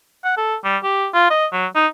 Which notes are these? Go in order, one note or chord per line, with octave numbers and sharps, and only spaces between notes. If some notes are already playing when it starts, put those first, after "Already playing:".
F#5
A4
G3
G4
F4
D#5
F#3
D#4